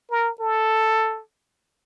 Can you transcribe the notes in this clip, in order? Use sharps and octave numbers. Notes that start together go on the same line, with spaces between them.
A#4
A4